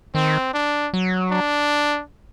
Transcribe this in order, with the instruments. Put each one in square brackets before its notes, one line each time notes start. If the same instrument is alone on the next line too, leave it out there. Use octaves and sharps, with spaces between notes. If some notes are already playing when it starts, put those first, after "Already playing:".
[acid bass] D#3 [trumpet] C4
[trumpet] D4
[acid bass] F#3
[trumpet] D4